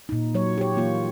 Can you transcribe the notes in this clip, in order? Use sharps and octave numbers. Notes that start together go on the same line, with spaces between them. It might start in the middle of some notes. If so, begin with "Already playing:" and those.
A#2 D#4
F#3 C#5
G4 C#5
E3 A#3 F4